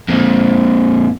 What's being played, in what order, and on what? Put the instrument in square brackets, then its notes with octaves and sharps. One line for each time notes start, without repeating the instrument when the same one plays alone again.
[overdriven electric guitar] F2 A#2